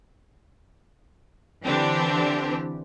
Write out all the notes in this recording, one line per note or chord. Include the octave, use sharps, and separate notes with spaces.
D3 E3 C4 D4 G4